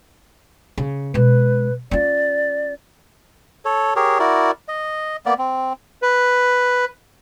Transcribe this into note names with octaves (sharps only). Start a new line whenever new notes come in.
C#3
B2 G#3 B4
C#4 F4 D5
A4 C#5
G4 G#4 A#4 C#5
E4 F#4 A#4 D5
D#5
A#3 B3 D5
C4
B4